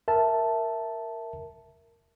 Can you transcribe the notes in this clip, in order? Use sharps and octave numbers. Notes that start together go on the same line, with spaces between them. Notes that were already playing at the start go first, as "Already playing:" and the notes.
A#4 E5 A5